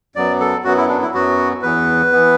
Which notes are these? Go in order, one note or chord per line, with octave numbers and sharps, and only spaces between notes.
F#2 F#3 B3 D5
A4
F#2 F#3 B3 F#4
E4
D4
E4
F#2 F#3 B3 F#4
E2 E3 B3 B4
E3 B3